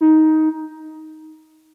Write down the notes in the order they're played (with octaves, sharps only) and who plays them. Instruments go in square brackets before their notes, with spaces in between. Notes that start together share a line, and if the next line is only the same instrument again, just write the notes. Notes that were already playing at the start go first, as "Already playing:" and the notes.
[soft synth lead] D#4